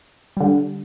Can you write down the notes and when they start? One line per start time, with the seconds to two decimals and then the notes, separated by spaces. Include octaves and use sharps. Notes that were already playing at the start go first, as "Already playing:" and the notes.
0.37 D3 G3